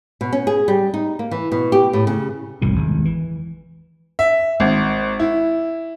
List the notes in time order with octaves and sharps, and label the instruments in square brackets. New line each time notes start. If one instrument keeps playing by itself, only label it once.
[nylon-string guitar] B2
C#4
G#4
G3
D#4
A#3
E3
B2
G4
A2
C#3
[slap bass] E1 C2 F#2 A2
G#1 E2
E3
[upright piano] E5
G#1
E4